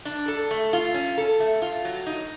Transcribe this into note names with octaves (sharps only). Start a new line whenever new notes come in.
D4
A4
A3
F4
C#4
A4
A3
F4
F#3
D#4